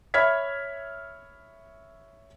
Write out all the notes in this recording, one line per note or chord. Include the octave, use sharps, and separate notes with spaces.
C#5 E5 B5 F6 G#6 B6